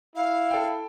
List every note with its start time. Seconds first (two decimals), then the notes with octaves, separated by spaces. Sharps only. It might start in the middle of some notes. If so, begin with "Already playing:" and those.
0.16 E4 F5
0.51 A4 G5